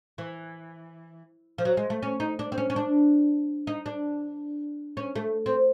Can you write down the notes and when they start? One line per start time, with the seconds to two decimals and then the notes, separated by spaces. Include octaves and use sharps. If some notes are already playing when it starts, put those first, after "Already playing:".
0.18 E3
1.58 F3
1.65 F#3
1.77 G#3
1.90 A3
2.03 C#4
2.20 D#4
2.39 D4
2.52 C4
2.58 C#4
2.70 C#4
2.76 D4
3.67 D#4
3.86 D4
4.97 C#4
5.15 A3
5.46 C4